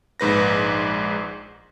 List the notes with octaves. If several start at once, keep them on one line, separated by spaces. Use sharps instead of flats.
A#1 G#2 B4 A#6